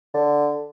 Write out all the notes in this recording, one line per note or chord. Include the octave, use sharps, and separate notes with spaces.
D3